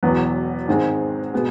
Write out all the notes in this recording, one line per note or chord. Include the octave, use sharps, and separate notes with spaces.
E1 E2 B2 F#3 B3
G#2 D#3 G#3 C4
B2 G#3 B3